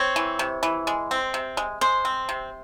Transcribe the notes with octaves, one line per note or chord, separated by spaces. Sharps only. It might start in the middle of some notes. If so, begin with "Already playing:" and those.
Already playing: C4 C#5
E3
C3
E3
G#3
C4
C3
G#3
G#3 C5
C4
C3